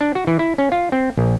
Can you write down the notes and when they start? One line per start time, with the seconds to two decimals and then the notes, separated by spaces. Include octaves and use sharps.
0.01 D4
0.15 F#4
0.27 E3
0.39 E4
0.58 C#4
0.72 F4
0.92 C4
1.17 A#1